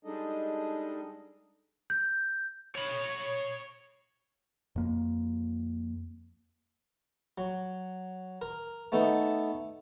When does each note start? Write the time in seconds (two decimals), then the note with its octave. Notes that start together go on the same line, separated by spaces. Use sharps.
0.05 G3 G#3 D4 D#4 A4 D#5
1.90 G6
2.75 C#5 B5
4.76 F2 A#3
7.38 F#3
8.42 A#4
8.92 A3 B3 D#4 A4